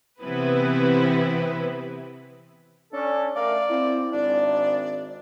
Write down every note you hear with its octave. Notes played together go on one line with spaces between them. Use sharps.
C3 E3 B3 C4 E4 B4
C#4 D4 A4
A3 A#4 D5 F5
C4 E4
G#1 D4 D5